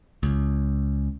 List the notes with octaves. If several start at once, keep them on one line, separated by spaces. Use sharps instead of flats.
C#2